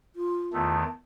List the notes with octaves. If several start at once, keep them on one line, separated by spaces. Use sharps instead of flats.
F4
E2 D#3 A3 A5